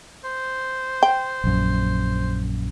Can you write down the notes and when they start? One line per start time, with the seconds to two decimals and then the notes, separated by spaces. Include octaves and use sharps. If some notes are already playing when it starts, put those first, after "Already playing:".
0.24 C5
1.03 G5
1.44 A#1 F#2